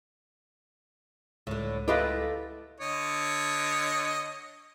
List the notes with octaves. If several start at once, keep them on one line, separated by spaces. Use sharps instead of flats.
C#2 A2 D3
A3 E4 F4 G4 B4 D#5
D3 C#5 D#5